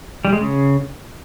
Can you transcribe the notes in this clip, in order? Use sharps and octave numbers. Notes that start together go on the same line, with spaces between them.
G3
G#3
C#3